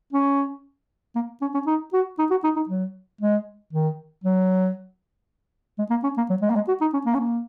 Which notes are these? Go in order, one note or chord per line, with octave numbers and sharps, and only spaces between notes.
C#4
A#3
C#4
C#4
D#4
F#4
D#4
F#4
D#4
D#4
F#3
G#3
D#3
F#3
G#3
A#3
C#4
A#3
F#3
G#3
A#3
G#3
F#4
D#4
C#4
A#3
C#4
A#3